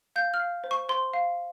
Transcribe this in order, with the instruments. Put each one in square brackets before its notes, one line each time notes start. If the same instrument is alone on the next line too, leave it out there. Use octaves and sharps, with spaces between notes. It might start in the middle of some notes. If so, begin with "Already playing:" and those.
[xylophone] F5 G6
F6
F5
C5
C#6
C5 C6
F5